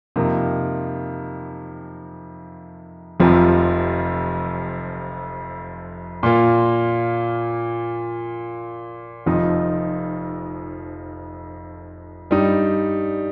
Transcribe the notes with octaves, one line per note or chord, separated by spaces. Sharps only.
F2 C3 F3 A#3 D#4
F1 F2 C3 F3
A#2 A#3 F4
F1 F2 F3 D#4
G2 G3 D#4